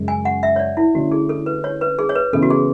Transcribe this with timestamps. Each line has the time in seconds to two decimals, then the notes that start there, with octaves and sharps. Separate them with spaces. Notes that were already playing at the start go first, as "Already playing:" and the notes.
Already playing: F#2 C#3 G#3
0.08 G#5
0.25 F#5
0.43 E5
0.56 C#5
0.59 D5
0.77 E4
0.95 D3 A3 C#4 E4 F#4
1.12 G#4
1.29 A4
1.46 B4
1.64 C#5
1.81 B4
1.99 G#4
2.09 C#5
2.15 B4
2.33 C#3 E3 B3 E4 A4
2.43 F#4
2.50 G#4